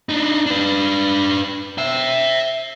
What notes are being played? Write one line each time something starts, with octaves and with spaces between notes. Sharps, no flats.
D4 D#4
D4 B4
E5 G5